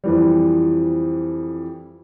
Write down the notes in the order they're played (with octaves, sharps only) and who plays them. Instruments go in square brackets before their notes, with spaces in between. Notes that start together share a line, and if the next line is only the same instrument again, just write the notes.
[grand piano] F2 E3 G3